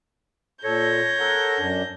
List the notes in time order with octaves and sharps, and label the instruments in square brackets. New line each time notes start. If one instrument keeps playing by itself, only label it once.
[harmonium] A#2 A4 [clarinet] C#5 [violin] G6 A#6
[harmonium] A4 A#4 F#5
F#2 D4